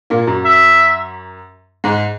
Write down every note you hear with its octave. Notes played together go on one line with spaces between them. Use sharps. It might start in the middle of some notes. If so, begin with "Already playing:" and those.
A#2 A#3
F#2 F#3
E5
G#2 G#3